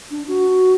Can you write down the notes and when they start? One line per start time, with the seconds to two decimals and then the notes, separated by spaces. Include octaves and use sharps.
0.11 D4
0.28 F#4